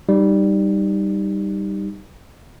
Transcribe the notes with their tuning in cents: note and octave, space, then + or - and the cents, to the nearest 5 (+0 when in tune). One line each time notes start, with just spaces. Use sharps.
G3 +0 D#4 -15